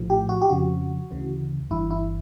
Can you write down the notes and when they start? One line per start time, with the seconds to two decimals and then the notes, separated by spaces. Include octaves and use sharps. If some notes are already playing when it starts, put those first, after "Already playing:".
Already playing: A#1 A2 F3
0.10 G4
0.29 F#4
0.42 G4
0.49 F2 C#3 F3 F#4
1.11 D2 C#3 E3
1.70 G1 G2 E3 E4
1.91 E4